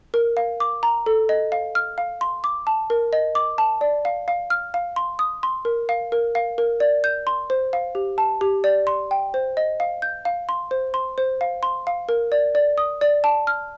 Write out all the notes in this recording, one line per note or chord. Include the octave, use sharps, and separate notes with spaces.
A#4
F5
D6
A#5
A4
D#5
F5
F6
F5
C6
D6
A5
A#4
D#5
D6
A5
D5
F5
F5
F6
F5
C6
D#6
C6
A#4
F5
A#4
F5
A#4
D5
G6
C6
C5
F5
G4
A5
G4
D5
C6
G5
C5
D#5
F5
G6
F5
C6
C5
C6
C5
F5
C6
F5
A#4
D5
D5
D#6
D5
A5
F6